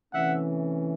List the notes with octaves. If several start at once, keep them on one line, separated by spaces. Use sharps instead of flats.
C3 E3 A3 C#4 E5 F#5